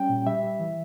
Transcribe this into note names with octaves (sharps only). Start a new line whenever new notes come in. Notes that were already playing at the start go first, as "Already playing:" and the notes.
Already playing: G3 C#4 G5
A#2
G3 E5
G3
E3